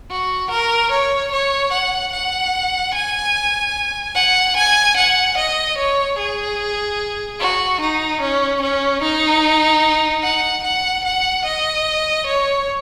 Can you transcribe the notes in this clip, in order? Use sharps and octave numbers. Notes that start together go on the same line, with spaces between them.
F#4
A#4
C#5
C#5
F#5
F#5
G#5
F#5
G#5
F#5
D#5
C#5
G#4
F#4
D#4
C#4
C#4
D#4
F#5
F#5
F#5
D#5
C#5